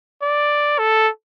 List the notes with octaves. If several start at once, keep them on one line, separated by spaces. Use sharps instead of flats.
D5
A4